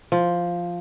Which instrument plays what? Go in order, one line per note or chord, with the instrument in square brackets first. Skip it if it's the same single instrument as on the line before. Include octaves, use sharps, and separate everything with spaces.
[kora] F3